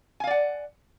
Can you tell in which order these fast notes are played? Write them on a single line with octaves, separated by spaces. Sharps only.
G#5 F5 D5 F#5